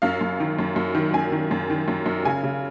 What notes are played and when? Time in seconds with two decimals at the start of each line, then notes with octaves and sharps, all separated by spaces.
0.02 F#2 F5
0.21 F#2
0.40 D#3
0.59 F#2
0.76 F#2
0.95 D#3
1.14 F#2 G#5
1.32 D#3
1.51 F#2
1.70 D#3
1.88 F#2
2.06 F#2
2.25 C#3 G#5
2.44 C#3